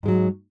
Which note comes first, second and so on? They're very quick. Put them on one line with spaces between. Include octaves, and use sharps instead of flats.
G#2 G#3 F#3